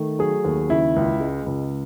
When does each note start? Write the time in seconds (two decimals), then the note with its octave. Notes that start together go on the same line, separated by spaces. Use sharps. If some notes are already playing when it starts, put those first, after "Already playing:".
Already playing: D#3 A3
0.19 F#3 G#4
0.44 D#2
0.70 C#3 E4
0.96 C#2
1.20 G#3
1.46 C#2